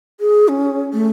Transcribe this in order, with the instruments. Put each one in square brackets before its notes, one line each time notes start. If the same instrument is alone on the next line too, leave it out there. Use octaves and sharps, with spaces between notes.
[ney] G#4
C#4
A3